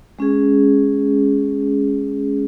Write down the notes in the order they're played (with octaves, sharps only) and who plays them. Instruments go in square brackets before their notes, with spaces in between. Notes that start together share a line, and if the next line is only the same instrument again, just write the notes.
[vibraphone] G#3 C#4 G#4